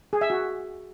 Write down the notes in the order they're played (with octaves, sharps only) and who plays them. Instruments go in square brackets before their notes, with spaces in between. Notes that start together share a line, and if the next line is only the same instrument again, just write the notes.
[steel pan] G#4
E5
F#4